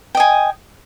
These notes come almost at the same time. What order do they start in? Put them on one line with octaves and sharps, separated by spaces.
G5 D#5 G#5